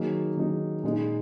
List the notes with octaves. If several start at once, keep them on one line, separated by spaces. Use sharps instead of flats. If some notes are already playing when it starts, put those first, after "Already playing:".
Already playing: D#3 F#3 A#3 D#4 G#4
D#3 F#3 A#3 D#4 G#4
A#2 G#3 D#4